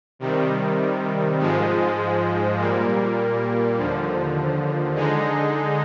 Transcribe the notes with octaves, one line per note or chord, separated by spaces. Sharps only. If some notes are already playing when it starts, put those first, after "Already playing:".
C3 D#3 G3
G#2 F3 G#3
A#2 G3 A#3
D#2 D3 F3
D3 G#3 D#4